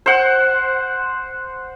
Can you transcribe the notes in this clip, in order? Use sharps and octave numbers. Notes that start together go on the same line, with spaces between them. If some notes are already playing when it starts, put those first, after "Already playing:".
C5 F#5